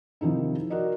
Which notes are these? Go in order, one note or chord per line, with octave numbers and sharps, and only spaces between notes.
C3 D#3 F3 D#4 E4
F#4 A#4 D5 D#5